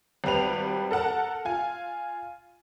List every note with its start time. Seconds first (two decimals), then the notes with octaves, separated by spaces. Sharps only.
0.24 G#1 G3 G4 B4 F7
0.91 A4 A#4 F#5 A5
1.45 F4 G#5